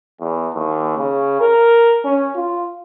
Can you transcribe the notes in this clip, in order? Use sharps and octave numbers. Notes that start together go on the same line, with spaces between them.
E2
D#2
C#3
A#4
C#4
F4